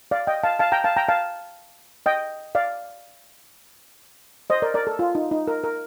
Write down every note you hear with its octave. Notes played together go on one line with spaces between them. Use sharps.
D5 F5
D#5 G5
F5 A5
F5 A5
G5 A#5
F5 A5
G5 A#5
F5 A5
D#5 G5
D5 F5
C5 D#5
A#4 D5
A#4 D5
A4
F4
D#4
D#4
A#4
A#4